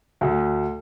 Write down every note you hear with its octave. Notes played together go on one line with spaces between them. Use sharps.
D2